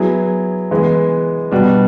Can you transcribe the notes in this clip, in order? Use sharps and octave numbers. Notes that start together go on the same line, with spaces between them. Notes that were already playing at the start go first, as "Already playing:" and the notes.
Already playing: F#3 B3 E4 G#4
E3 G#3 B3
B2 G3 B3 D4 F#4